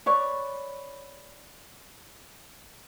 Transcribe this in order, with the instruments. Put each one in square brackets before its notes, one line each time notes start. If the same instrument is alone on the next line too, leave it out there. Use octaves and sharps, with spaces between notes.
[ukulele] B4 C#5 D5